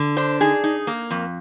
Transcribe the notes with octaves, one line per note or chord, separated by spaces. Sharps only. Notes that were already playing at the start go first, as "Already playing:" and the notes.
Already playing: D3
D4 C5
D#4 G#4
D#4
A#3
F2